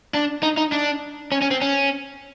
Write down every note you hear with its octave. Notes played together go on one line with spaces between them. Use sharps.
D4
D#4
D#4
D4
C#4
C#4
C4
C#4